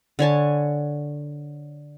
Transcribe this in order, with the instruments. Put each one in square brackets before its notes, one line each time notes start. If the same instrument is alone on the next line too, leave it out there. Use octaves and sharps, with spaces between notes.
[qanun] D3 C#5 G#5 A5